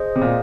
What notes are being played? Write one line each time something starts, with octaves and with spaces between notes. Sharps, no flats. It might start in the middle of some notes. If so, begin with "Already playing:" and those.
Already playing: G#4 C5 D#5
C3
A#2